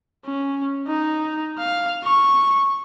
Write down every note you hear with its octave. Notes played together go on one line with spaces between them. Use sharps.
C#4
D#4
F5
C#6